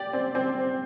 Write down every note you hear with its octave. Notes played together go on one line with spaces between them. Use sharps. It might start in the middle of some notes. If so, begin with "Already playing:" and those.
Already playing: G4 D5
C4
C4